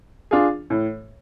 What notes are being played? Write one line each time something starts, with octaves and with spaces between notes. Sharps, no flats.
D4 F4 G#4
A2